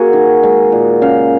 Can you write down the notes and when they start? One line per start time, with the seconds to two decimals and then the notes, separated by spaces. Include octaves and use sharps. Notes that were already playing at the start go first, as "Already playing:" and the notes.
Already playing: A#3 F#4 G#4
0.13 D#3
0.43 G#3
0.72 A#2
1.02 C#3 F5